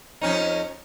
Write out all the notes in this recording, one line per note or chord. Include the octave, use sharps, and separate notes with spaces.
F2 C#4 D#4